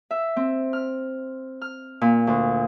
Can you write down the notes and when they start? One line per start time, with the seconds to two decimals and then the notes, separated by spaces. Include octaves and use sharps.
0.11 E5
0.37 C4
0.73 F6
1.61 F6
2.01 A#2
2.27 D2